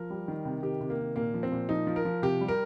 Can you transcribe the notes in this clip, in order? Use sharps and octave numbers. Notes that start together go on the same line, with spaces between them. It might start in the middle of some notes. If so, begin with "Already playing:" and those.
Already playing: F3 A#4
G3
D#3
C3
D#3 G4
C3
A#3
D#3
A#2 A#3
F3
C4
A#2
F3 D#4
F3
A#4
F3
C3 G4
G3
A#4